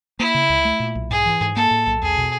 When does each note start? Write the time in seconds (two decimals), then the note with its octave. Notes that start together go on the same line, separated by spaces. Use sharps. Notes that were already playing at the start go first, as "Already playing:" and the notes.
0.19 A#3 E4
0.35 C#3
0.49 C#2
0.65 A3
0.80 A#2
0.95 B1
1.10 G#2 G#4
1.26 E3
1.41 G#2
1.56 A#3 A4
1.71 A2
1.87 B1
2.02 E2 G#4
2.17 B2